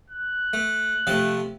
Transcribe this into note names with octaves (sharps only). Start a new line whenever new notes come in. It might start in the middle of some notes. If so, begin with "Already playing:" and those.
F#6
A3
C3 F3 A3 A5